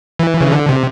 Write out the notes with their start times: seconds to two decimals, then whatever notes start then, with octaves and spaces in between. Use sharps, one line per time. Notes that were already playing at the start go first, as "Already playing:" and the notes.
0.19 E3
0.41 C#3
0.52 D3
0.69 C3